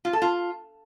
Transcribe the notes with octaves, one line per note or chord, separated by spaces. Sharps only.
F4
A4
F4